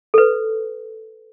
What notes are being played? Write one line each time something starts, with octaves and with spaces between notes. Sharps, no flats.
A4 B4